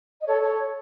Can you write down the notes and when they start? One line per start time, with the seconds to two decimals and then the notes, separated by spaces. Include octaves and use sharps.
0.20 D#5
0.26 A4 C#5
0.41 A4 C#5